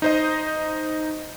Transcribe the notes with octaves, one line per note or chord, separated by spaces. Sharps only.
D#4 C5 D#5